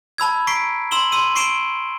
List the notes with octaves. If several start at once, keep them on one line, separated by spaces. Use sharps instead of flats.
A5 B5 E6 G#6
A#5 C#6 B6 C7 D7
C6 E6 E7 F#7 G7
C6 E6 D#7
C#6 C7 D7 E7 G7